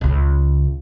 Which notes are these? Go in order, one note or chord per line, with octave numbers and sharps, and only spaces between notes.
C#2 C#3